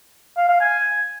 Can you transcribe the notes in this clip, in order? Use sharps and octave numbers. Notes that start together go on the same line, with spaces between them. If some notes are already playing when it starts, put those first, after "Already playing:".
F5
F5
G#5